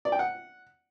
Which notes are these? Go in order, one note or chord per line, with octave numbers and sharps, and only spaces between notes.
D5
G5
F#5